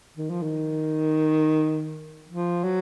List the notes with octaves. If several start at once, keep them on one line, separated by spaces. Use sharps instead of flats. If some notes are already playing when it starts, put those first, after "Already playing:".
D#3
F3
D#3
F3
F#3